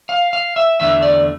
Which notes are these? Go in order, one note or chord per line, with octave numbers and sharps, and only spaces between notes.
F5
F5
E5
E2 D3 A3 E5
D5